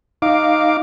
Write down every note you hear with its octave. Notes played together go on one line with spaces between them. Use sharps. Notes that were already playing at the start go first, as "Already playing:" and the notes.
D#4 F5 D6